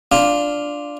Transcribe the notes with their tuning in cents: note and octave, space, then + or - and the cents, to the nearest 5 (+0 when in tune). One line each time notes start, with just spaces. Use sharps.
D4 +0 F4 +0